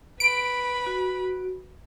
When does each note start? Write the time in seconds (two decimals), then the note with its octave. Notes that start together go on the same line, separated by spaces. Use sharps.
0.20 B4 B5 D7
0.86 F#4